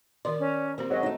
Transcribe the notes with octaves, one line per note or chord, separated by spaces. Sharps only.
D#3 A#4 D5 C6
C#4
F3 A#3 C4 G4 C5
G#2 F#3 D#5
A3 D#4